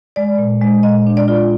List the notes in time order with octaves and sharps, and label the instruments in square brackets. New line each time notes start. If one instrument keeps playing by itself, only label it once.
[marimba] G#3 D5
A#2
G#3
A#2 D#5
D4
D5
F4